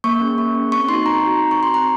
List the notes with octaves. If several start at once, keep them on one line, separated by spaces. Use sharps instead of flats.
A#3 C#6
C#4 G#4
A#3
C#4 G#4
C4 C#6
D#4 F#4 C6
C4 A#5
D#4 F#4
C4
C#6
F#4
C6
C4 A#5